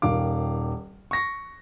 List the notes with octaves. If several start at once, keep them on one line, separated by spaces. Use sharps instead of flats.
D#1 D#3 F5 D6
C#6 A#6